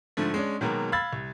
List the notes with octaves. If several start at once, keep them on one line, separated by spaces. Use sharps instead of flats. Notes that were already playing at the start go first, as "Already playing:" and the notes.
G#2 D3 F3 A3
G#3 C#4 D4
B2 D#3 F#3 G#3 A#3 B3
F5 B5 E6 G#6 A6
C2